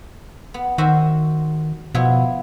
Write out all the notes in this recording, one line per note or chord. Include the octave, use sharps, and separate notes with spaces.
B3
D#3 F#4 C5 E5
B2 F3 B3 E4